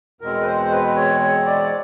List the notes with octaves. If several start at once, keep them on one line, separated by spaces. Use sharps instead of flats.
E2 B2 G#3 C4 A#4
B4
C5
B4
C#5
C#5
D5